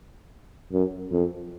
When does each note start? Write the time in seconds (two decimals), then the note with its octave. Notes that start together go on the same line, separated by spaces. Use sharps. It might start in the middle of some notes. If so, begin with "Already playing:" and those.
0.72 F#2
1.12 F2